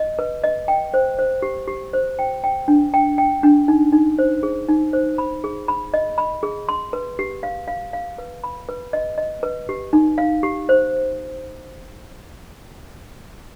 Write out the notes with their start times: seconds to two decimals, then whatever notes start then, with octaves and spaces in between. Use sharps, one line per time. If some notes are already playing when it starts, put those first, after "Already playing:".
Already playing: D#5
0.19 B4
0.44 D#5
0.68 G5
0.94 C5
1.19 C5
1.42 G4
1.68 G4
1.93 C5
2.19 G5
2.44 G5
2.68 D4
2.94 G5
3.18 G5
3.43 D4
3.68 D#4
3.93 D#4
4.19 C5
4.43 G#4
4.69 D#4
4.93 C5
5.18 B5
5.44 G#4
5.68 B5
5.94 D#5
6.18 B5
6.43 G#4
6.69 C6
6.93 B4
7.19 G4
7.43 F5
7.68 F5
7.93 F5
8.18 B4
8.44 B5
8.69 B4
8.93 D#5
9.18 D#5
9.43 B4
9.69 G4
9.93 D#4
10.18 F5
10.43 G4
10.69 C5